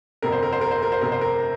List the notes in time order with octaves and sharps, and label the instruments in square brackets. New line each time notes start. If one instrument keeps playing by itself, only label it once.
[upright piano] G1 F2 C3 A#4
C5
A#4
C5
A#4
C5
A#4
C5
G1 F2 C3 A#4
C5
A#4